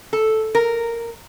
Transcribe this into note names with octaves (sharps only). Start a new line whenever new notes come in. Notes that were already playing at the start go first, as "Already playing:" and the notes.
A4
A#4